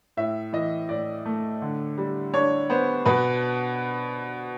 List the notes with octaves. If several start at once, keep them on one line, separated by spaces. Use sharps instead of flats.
A2 E5
E3 D#5
A2 D5
A3
D3
G3
D4 C#5
B3 C5
B2 B4